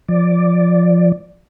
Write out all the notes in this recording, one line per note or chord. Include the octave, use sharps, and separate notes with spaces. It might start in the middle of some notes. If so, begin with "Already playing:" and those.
F3 D5